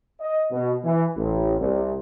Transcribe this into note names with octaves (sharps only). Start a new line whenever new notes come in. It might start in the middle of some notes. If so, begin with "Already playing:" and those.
D#5
B2
E3
A1
C2